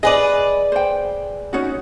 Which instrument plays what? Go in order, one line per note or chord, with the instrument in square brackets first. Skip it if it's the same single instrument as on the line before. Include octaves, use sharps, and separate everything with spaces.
[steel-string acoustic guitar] G#4 B4 D5 [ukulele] D#5 G#5
[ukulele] C5 G5
C#4 D#4 F#4